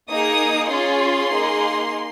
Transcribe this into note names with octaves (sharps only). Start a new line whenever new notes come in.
A#3 D#4 G#4 D#6
C#4 F4 G#4 C6
A#3 D#4 G#4